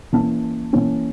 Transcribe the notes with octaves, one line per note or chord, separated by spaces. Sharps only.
E3 A#3 C#4 A5
E3 A#3 C#4